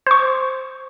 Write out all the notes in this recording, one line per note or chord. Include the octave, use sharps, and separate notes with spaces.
C5 C#6